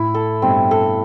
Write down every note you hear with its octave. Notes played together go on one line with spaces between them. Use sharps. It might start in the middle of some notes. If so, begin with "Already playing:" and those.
Already playing: A2 E4
A4
G2 B2 C4
A4